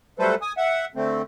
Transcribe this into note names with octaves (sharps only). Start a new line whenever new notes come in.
F#3 G3 A3 A4 B4 C5
G#5 D#6
E5 F#5
D3 A3 C4